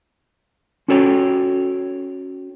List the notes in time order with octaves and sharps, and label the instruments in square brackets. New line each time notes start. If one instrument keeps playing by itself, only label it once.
[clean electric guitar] C#4 F#4 A4 C#5 G5